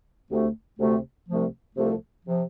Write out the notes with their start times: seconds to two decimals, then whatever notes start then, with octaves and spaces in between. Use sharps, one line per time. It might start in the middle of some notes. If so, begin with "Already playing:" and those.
0.30 D2 C3 A3
0.79 D2 C3 A3
1.28 C2 C3 F3 A3
1.76 C2 C3 F3 A3
2.25 C3 F3